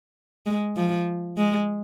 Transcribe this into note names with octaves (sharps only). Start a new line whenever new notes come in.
G#3
F3
G#3